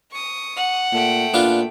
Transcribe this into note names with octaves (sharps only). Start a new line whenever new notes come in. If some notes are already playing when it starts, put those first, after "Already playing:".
C#6 D#6
F#5
A#2 A3 G5
A#2 B3 D4 F4